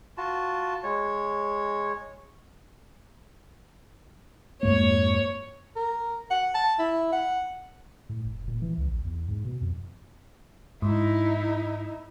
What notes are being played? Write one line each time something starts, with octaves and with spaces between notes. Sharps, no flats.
F4 F#4 A5
G#3 C#5
F2 G#2 A#3 C#5
A#4
F#5
A5
E4
F#5
A2
F1
A#2
E3
C#2
A#1
E2
G#2
B2
F2
G#2 D#4 E4